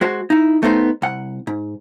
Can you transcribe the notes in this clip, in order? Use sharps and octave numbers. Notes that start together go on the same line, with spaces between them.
G#3 F#4 C5
D#4 E4
A3 B3 D#4 C5
C2 F#5
G#2